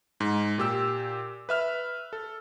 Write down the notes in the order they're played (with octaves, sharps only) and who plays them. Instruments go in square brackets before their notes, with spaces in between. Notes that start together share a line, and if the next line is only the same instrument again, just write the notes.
[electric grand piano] G#2
A#2 G4 E6
B4 E5 F6
A4